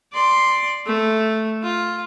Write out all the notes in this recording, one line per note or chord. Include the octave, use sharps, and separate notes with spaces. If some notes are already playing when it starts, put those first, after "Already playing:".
D5 C6
A3
F4